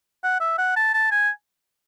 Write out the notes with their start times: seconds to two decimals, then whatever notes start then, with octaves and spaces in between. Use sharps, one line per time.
0.24 F#5
0.41 E5
0.58 F#5
0.76 A5
0.94 A5
1.11 G#5